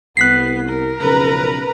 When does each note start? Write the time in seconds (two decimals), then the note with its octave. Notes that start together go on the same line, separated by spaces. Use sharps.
0.17 C2 B3 F#6 B6 C7
0.69 A#4
1.00 B1 F2 C#3 B4 A#5